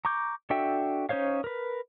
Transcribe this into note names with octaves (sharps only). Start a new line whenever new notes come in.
A#5 C#6 D6 G6
D4 F#4 A4 E5 G5
C#4 D#4 C5 C#5 F5
A#4 B4